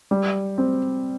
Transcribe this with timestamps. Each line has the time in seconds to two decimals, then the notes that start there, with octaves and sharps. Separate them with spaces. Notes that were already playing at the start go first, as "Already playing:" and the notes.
0.11 G3
0.58 C4